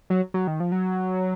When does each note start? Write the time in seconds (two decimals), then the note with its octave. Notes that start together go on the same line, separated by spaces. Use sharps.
0.10 F#3
0.34 F#3
0.47 D#3
0.60 F3
0.72 F#3